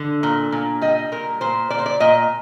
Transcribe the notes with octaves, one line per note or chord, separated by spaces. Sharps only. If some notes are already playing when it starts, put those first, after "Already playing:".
Already playing: D3
A#2
A#2
G3 D#5
A#2 A#4
A#2 C5
A#2 D5
C5
D5
A#2 D#5